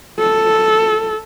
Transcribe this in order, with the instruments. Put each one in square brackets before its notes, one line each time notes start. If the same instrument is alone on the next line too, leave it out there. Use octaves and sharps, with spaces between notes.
[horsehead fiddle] A4